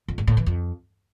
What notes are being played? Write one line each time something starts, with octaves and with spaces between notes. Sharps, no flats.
F2
G#2
A2
E3
F2